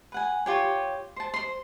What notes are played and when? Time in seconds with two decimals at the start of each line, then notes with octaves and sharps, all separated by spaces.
0.12 B4 F#5 G#5
0.46 F4 G4 C#5
1.16 C5 A5
1.34 C5 C6